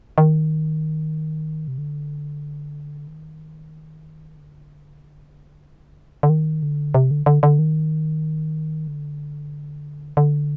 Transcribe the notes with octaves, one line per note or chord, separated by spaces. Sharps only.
D#3
C3
D3
D#3
D3
D3
D#3
D3
C3
D3
D3
D3
D#3
D3
D3